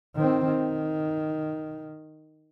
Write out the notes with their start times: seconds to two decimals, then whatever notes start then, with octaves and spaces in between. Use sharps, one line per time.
0.15 D#3 C4
0.47 D#3